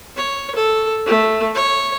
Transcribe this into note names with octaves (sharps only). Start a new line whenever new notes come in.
C#5
A4
A3
C#5